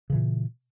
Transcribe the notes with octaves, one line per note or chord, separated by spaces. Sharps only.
A#2 C#3 E3